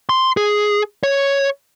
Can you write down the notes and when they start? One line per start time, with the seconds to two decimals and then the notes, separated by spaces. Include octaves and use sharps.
0.09 C6
0.37 G#4
1.03 C#5